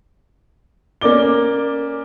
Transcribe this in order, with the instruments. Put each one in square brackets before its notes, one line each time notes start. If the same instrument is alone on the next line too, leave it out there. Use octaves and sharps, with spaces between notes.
[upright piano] A#3 C#4 D5 D6 G7